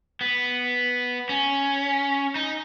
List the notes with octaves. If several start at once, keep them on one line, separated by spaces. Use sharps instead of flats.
B3
C#4
D#4